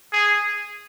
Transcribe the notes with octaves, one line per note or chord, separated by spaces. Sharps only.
G#4